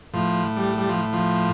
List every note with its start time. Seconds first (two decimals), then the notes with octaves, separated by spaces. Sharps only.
0.14 A2 F3
0.57 G3
0.78 G3
0.89 F3
1.13 F3